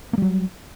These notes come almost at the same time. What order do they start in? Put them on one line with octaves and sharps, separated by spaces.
A#3 G3 F#3